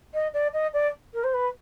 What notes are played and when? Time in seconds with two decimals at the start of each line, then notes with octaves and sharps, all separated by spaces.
0.14 D#5
0.34 D5
0.53 D#5
0.73 D5
1.14 A#4
1.24 C5
1.34 B4